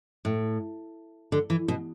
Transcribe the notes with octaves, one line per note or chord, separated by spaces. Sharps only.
A2
D3
E3
B2